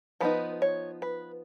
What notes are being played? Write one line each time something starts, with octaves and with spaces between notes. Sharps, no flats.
F3 B3 D#4 B4
C#5
B4